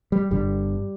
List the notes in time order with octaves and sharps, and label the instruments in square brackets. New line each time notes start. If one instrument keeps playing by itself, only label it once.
[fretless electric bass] G3
G1 G2 D3 G3